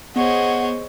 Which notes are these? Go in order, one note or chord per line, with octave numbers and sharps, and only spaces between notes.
B3 G#4 C5 C#5 D#5 F#5